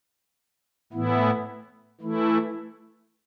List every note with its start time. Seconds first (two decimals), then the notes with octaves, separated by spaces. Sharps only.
0.93 A2 E3 B3 E4
2.00 E3 A3 E4